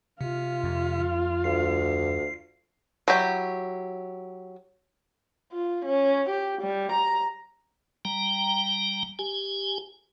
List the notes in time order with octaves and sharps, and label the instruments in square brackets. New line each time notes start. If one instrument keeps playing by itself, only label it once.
[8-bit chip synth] C3 [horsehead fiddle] F4 F5
[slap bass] F2
[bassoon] D2 [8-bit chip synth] C7
[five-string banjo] F#3 E4 G4
[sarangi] F4
C#4
G4
G3
A#5
[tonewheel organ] G3 G5 A#5
G4 G#5